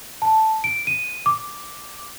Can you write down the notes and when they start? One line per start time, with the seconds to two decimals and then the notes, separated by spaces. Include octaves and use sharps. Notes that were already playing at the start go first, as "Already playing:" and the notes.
0.22 A5
0.64 D7
0.87 D#7
1.26 D6